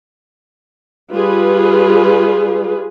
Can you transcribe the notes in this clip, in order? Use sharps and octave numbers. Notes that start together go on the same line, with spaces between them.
G3 F4 G#4 B4